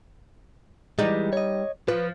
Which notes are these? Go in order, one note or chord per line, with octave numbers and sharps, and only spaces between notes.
E3 G3 G#3 D#4
C#5 D#5
F3 B4